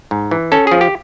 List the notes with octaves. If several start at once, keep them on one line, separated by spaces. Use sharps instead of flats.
G#2
E3
C#4 A4
F3 G#4
G4